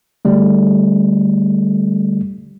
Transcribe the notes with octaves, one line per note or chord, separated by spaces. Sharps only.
D3 G3 A3